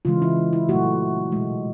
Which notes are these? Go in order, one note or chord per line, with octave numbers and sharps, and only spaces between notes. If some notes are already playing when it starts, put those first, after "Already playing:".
C#3 E3 G#3 F4
E4
E4
A#2 F#3 A3 F#4
B2 G#3